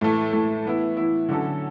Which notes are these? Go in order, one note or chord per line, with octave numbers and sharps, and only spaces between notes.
A2 E3 A3
A2 E3 A3
E3 B3 E4
E3 B3 E4
D3 F#3 C#4 F#4 A4